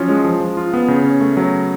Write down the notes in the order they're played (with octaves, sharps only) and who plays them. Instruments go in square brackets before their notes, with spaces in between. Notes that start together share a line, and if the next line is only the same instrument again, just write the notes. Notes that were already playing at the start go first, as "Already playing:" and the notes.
Already playing: [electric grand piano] F3 F#3 C#4 F4
G#3
F3
F3
F4
B3
C#3
C#4
A3
F#3